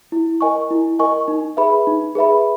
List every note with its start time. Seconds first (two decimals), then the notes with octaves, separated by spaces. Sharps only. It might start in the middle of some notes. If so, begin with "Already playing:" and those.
0.12 E4
0.41 A#4 D#5 G#5 C#6
0.71 E4
0.99 A#4 D#5 G#5 C#6
1.28 D#4
1.57 G#4 B4 E5 B5
1.87 D#4
2.15 G#4 B4 E5 B5